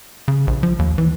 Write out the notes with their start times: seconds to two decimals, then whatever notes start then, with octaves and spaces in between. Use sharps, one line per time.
0.28 C#3
0.47 A#1
0.63 F3
0.79 D#2
0.98 E3